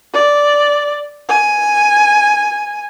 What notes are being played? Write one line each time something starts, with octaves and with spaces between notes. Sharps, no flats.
D5
G#5